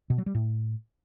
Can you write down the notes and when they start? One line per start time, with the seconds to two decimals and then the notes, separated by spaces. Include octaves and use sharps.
0.10 B2
0.18 F#3
0.26 G3
0.35 A2